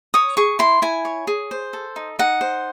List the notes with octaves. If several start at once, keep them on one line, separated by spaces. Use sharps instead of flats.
C#5 D#6
G#4 C#6
E4 C6
E4 G#5
C#5
G#4
C5
A4
D#4
D#4 F#5
C5